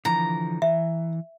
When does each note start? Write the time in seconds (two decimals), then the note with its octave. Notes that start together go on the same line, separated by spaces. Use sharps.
0.05 D3 E3 F3 A#5
0.62 E3 E5